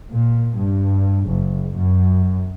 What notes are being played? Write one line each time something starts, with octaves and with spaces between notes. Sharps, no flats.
A#2
G2
F#1
F#2